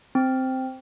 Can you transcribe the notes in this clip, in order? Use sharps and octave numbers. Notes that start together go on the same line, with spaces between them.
C4